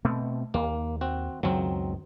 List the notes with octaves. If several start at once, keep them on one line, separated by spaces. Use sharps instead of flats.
B2 A3 C4
D#2 A#3
C4 F#4
C#2 F#2 D#3 F#3 C4